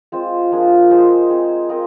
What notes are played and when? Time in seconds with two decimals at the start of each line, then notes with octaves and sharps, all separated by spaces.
0.12 G#3 C4 F4 C5
0.51 F3 A#3 D4 G#4
0.90 G#3 D#4 G#4 C5
1.30 C4 D#4 G#4
1.69 C4 F4 A#4 D#5